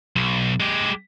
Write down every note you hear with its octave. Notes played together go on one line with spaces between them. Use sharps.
B1
G#3 G4